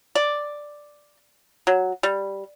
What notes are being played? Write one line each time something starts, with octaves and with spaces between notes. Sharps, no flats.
D5
F#3
G3